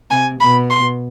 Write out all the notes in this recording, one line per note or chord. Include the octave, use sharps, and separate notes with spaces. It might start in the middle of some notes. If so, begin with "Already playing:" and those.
C3 G#5
B2 B5
C6